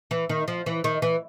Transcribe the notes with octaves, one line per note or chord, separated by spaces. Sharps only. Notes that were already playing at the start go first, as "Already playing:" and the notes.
E3
D#3
F3
E3
D#3
E3